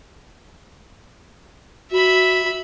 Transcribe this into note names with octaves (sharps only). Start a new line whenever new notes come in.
F#4 E5 B5